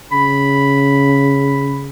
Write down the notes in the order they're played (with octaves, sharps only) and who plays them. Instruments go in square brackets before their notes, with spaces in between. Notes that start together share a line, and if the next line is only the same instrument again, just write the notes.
[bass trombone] C#3 [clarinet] B5